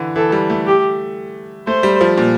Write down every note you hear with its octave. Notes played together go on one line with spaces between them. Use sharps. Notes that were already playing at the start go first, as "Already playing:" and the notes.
Already playing: D3 E3
E3 A4
G3
A3
G4
A3 C5
G3
F3
A#2